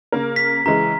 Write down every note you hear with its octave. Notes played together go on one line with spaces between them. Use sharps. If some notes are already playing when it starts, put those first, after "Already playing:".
C#3 A#3 A#4
B6
C#3 E3 G#3 A#5